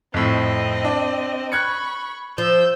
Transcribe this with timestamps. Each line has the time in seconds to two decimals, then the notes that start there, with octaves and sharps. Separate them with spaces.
0.14 F2 A2 C4 D#5
0.84 D4
1.52 B5 C#6 F#6 G#6 C#7
2.38 F3 E6 G6